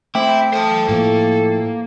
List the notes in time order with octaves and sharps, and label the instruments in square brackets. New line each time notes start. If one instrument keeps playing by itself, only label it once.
[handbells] A3 G5 D6 [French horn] C4 [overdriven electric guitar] E4
[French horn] A4 [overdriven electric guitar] C5 A5
[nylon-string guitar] A2 F3 [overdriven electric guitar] A#3